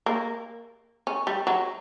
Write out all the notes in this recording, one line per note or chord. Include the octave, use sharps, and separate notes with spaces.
A#3
C#4
G3
F#3